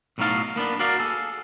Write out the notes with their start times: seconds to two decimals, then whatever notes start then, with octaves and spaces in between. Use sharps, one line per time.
0.18 B1 A2 F#3 D#4 F5 A5
0.56 A#3 B3 D4
0.79 F#4 A#4 D5 F5
1.00 G#4 A4